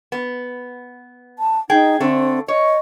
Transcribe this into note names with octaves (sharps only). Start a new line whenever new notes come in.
B3
A5
D#4 G#4 G5
D3 A3 C4
C#5 D#5